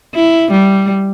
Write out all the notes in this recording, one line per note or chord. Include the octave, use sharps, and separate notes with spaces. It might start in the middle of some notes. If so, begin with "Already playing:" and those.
E4
G3